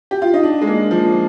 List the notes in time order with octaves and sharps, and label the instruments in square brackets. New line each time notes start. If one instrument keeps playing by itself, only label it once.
[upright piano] G4
F4
D#4
D4
G#3
A#3
F3